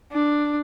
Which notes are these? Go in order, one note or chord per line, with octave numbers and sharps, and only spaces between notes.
D4